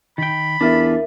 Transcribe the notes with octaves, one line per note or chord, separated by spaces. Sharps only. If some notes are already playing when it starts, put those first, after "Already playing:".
D#3 G5 B5
E2 D4 F4 A4 A#4 E5